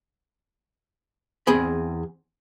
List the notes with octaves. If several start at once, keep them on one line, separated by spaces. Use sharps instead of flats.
E2 C4 G#4 B5